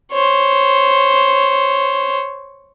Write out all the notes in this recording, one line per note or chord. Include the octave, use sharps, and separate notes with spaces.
C5 C#5